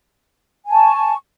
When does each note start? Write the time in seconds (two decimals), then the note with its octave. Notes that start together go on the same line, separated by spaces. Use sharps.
0.66 G#5
0.71 A5
0.76 C#6